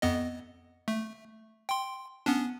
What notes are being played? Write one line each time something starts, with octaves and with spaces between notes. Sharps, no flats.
F2 B3 D#5
A3
G5 C6
B3 C#4 D4